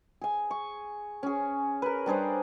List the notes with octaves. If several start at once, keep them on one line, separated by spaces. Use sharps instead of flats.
G#4 G#5
C#6
C#4 G#4
A#4 B4
G3 D4 G#4 C5